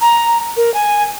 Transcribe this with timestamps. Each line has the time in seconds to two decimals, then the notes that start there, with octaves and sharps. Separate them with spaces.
0.01 A#5
0.57 A#4
0.74 G#5